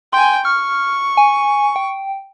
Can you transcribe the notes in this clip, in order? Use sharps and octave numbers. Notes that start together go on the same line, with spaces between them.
G5 G#5 C6
C#6 F6
G#5
G5